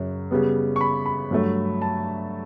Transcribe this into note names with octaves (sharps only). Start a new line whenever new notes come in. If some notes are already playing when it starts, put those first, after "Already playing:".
Already playing: F#2 C#3 F#3
C#3 G3 B3
C#6
B5
B5
G2 F#3 A3
A5